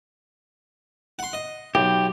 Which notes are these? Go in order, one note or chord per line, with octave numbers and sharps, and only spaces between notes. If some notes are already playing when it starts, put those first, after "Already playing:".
F#5 C6
D#5
B1 G4